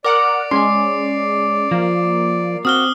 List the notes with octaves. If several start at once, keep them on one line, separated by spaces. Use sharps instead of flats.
A#4 D5 F#5 D6
G#3 C#4 G#5 C6 C7
F3 A#3
C4 F#4 D#6 F6 G7